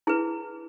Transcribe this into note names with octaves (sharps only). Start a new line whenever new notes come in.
E4 G#4 B4